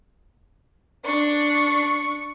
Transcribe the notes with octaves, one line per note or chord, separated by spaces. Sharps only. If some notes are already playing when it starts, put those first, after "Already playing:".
D4 C#6